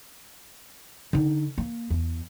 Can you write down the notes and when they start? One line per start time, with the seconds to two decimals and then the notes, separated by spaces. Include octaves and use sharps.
1.13 D3 D#4
1.58 A#3
1.90 E2